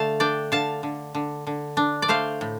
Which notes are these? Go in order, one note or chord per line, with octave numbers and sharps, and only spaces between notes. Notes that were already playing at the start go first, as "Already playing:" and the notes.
Already playing: D3 A3 F5 A5
D4 D5 G5
D3 F5 A5
D3
D3
D3
D4
D5
A3 C5 F5
A2